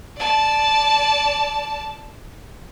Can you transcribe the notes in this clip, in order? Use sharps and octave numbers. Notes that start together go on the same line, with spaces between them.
D5 A5